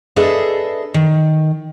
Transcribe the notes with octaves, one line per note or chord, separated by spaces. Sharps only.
D4 G#4 A4 B4 D#5 E5
D#3